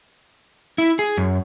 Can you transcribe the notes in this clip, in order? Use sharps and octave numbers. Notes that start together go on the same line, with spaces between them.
E4
G#4
F#2